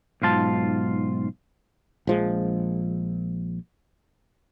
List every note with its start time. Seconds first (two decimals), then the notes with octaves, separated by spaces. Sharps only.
0.22 B1 G#2 F4 A5
2.07 A#1 F3 G#3